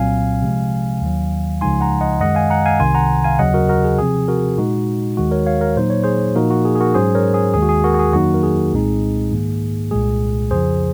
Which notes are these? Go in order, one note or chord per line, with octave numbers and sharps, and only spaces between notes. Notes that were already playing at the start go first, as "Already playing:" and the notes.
Already playing: C2 A#2 F#3 C4 F5 G#5
C3 F3 G#3
D#2 D#3 F#3
C#2 C#3 F3 G#3 D#4 G#5 C6
F#5 A#5
D#5 F#5
F#2 D#3 G#3 D#5 F#5
F5 G#5
F#5 A#5
F5 G#5
C2 C3 D#3 G#5 C6
F#5 A#5
F5 G#5
D#2 C#3 F#3 D#5 F#5
F#4 A#4
F#4 A#4
G#4
C3 F3 C4 G#4
F#4 A#4
A#2 G#3 D#4 F#4
D#2 D#3 G#3 F#4
A#4 C#5
C#5 F5
A#4 C#5
A#2 F#3 A#3 D#4 C5
C#5
G#4 C5
A#2 F3 A#3 D#4 F#4 A#4
F#4
G#4
G#4
F#4 A#4
G#2 F#3 C#4 G#4 C5
A#4 C#5
G#4
D#2 D#3 G#3 G#4
F#4
G#4
F#4 A#4
F#4
G#4
F2 D#3 F#3 A#3 D#4 F#4
A#4
G#4
C2 A#2 G#3 C4 D#4
G#2 D#3 A#3
C2 A#2 G#3 G#4
F2 C#3 F3 G#4 C5